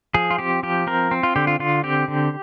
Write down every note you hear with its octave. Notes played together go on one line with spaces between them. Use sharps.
F3 G#4
F4
C4 G4
F3 G4
C4 A#4
C4
F4
D3 G4
F4
D3 F4
C4 G4
D3